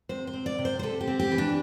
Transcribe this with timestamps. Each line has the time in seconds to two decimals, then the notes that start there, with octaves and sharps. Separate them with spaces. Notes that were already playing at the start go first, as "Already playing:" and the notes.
0.09 C3 C5
0.27 C5
0.34 C4
0.46 D5
0.59 C3
0.65 C5
0.79 C5
0.83 C3 A4
1.01 G4
1.07 C4
1.19 G4
1.32 E3
1.38 D4